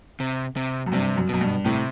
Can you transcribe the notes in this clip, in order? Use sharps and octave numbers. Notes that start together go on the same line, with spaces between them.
C3
C3
F#2
G2 C3
F#2
F#2 B2
G2
A2 C3